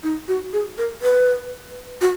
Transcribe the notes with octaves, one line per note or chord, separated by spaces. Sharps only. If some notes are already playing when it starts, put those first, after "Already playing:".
D#4
F#4
G#4
A#4
B4
F#4